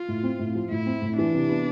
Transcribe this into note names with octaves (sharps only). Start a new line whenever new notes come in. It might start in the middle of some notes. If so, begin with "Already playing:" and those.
Already playing: F4
A2
C4
A2
F3
A2 E4
C4
A2
E3 D4
C3
B3